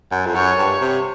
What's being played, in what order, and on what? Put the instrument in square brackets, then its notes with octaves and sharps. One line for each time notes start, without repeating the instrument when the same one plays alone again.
[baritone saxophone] F#2
F2
[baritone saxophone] F#2 [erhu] C#5
[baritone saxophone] G2
C3